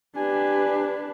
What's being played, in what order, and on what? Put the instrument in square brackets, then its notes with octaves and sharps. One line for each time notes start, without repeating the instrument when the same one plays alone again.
[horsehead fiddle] D4 B4 [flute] G4 [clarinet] G#5